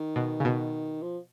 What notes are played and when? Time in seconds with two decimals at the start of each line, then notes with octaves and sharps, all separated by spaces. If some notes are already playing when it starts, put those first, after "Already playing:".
Already playing: D#3
0.16 B2
0.40 C#3
0.45 B2
1.02 F3